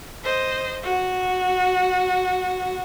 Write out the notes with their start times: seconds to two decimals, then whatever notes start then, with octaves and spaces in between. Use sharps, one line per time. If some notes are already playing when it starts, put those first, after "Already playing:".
0.24 C5 D#5
0.83 F#4